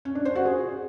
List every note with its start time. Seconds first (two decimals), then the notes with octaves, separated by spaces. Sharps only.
0.05 C#4
0.15 D4
0.25 C5
0.35 F#4
0.46 G#4